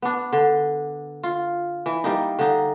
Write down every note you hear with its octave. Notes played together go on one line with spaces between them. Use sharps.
B3 D4
D3
F4
E3
G3 A#3 D#4
D3 D#4